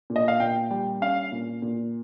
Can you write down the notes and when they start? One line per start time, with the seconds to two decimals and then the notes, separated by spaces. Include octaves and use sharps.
0.10 A#2
0.16 D#5
0.28 F5
0.40 A#2 G5
0.70 G3 G5
1.02 C#4 F5
1.32 A#2
1.62 A#2